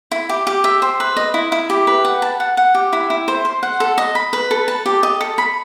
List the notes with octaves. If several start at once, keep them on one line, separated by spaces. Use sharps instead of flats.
E4
G4
G4
E5
C5
B4
D#5
E4
E4
G4
B4
F#5
A5
F#5
F#5
G4
E4
E4
C5
C5
F#5
A4
D#5
B5
B4
A4
A5
G4
D#5
A4
B5